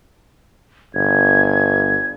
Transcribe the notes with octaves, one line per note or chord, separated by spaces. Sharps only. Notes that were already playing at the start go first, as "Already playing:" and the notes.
G1 G#6